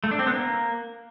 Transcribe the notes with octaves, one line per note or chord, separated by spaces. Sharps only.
A3
D4
C4
B3
A#3